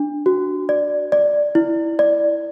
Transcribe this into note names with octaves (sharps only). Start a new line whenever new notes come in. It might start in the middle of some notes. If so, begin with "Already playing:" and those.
Already playing: D4
F#4
D5
D5
E4
D5